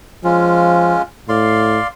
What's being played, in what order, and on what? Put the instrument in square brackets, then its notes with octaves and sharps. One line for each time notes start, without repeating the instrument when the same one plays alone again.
[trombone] F3 [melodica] G#3 C#4 F4
[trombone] A2 [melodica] D5 F5 C6